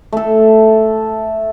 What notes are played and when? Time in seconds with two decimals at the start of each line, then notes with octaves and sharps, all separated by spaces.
0.13 A3 A4